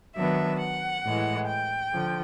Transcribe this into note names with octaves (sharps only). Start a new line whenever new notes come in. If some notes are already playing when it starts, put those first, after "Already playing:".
D#3 F#3 B3 D4 E5
F#5
A2 E3 G#3
G5
D3 F3